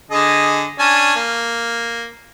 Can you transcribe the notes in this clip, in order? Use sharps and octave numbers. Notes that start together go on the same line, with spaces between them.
D3 G#4 D#5
C#4 D4 G#5
A#3